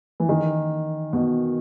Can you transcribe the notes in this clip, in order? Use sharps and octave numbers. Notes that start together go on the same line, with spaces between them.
E3
D#3
B2